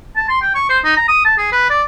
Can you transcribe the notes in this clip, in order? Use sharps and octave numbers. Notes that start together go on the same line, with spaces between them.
A5
C6
G5
C#6
C5
D#4
A#5
D#6
A5
G#4
B4
D5